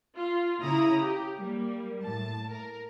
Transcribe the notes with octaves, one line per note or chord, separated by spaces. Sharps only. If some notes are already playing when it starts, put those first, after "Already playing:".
F4
C#3 E4 A#5 D#6
G4
G3 A#3
A2 A5
A#4